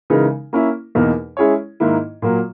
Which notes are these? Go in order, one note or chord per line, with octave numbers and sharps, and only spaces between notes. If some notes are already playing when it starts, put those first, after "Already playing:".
C#3 E3 G#3 D#4 A#4
A#3 C#4 E4
E2 B2 A#3 D#4 A#4
G#3 C#4 E4 G#4 C#5
G#2 D#3 A#3 E4
A#2 F#3 A#3